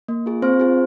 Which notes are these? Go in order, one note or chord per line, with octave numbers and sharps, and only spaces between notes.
A#3
F4 G#4
C4 C5
F4 G#4